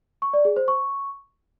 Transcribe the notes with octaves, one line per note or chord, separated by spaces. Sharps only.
C#6
D5
G#4
C5
C#6